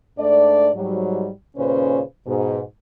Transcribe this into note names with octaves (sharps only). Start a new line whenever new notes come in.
G#2 A3 D4 D5
G#2 F#3 G3
D#2 A#2 C#3 C#4 B4 C5
G#2 B2